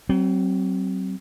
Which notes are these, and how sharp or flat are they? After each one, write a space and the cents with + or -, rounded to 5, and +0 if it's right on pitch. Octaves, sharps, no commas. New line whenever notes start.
F#3 +40 C4 +10